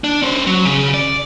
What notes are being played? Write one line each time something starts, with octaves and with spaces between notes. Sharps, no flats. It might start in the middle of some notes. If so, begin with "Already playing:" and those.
D4
C#4 C5
F#3
C#3
D5